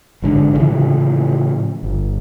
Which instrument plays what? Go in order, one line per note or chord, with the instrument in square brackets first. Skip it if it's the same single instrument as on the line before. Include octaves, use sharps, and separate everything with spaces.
[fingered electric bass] A1 G#2 D3
A2 C#3 E3 F3
G1